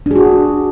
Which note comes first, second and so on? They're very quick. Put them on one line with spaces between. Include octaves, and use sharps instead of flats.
D4 G#4 F#4